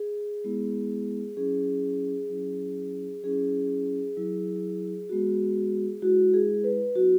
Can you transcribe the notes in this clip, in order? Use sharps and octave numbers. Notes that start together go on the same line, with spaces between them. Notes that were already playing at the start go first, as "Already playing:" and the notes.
Already playing: G#4
G#3 B3 E4
F#3 C#4 E4 G#4
F#3 C#4 E4
F#3 C#4 E4 G#4
F#3 E4
G#3 B3 F#4
G#3 E4 F#4
G#4
B4
F#3 B3 E4 F#4